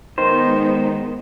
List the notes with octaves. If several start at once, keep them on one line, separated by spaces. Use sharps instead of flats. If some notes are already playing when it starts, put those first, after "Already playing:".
D#3 G#3 B3 D#4 C5